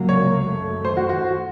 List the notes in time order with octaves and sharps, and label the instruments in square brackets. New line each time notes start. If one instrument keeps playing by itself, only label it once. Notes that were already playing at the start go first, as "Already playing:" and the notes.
Already playing: [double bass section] C#2 C3 F#3 A#3
[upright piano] C#5
[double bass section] F#2 D#3 A3
[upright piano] C5
F#4
F#4